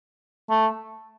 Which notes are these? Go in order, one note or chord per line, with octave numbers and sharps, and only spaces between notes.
A3